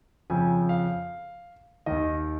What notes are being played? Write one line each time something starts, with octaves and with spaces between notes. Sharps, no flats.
F2 C#3 F3 G#5
F5
D#2 D#3 D#5